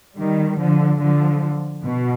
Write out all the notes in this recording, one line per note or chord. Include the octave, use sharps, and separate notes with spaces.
D#3 G3
D3 F3
D3 F3
B2